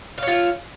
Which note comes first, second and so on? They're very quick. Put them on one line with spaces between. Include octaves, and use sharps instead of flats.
F5 C#5 F4 E5